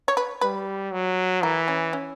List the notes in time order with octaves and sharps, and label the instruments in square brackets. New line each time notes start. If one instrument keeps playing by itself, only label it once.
[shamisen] C#5
B4
[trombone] G3 [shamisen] B4
[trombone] F#3
[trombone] E3 [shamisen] A#4
[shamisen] C#4
C#4